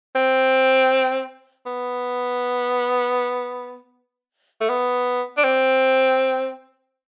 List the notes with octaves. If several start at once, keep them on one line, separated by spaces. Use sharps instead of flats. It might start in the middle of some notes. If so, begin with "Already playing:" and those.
C4
B3
A3
B3
D4
C4